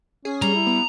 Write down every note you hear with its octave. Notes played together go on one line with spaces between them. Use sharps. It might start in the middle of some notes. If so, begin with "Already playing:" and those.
C#4 G#4
G3 A#5
E4
B3